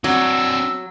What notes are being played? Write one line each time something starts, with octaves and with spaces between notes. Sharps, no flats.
F#3 C4 D4 E6